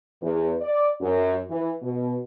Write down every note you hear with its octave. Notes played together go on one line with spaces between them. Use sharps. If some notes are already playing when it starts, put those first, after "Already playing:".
E2
D5
F#2
E3
B2